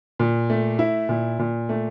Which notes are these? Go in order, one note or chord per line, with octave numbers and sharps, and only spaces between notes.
A#2
A3
E4
A#2
A#2
A3